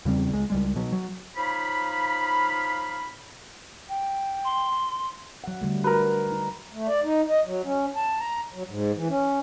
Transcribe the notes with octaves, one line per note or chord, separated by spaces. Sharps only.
E2 C#3 G3 C4
C#2 G#3
C#2 G3 G#3
B2 F#3
F#3
F3 D#4 C#5 F5 B5
G5
C6
F#3 F#5
D3 G3 A3
F#4 A#4 B4
D#4
A3
D5
D#4
D#5
F#3
C#4
A5
A#5
F#3
G#2
E3
C#4